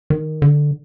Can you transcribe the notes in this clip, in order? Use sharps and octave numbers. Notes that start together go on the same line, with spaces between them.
D#3
D3